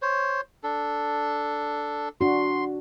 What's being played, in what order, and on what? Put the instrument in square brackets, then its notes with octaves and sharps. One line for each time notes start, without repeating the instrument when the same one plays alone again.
[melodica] C5 C#5
D4 A4
[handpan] D4 F#4 [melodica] C6